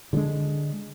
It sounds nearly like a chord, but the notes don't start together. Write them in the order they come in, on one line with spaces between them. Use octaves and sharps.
D3 F3 G#3 D4